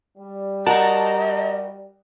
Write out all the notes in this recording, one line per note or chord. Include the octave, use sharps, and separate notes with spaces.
G3
F#4 A#4 D#5 A5 A#5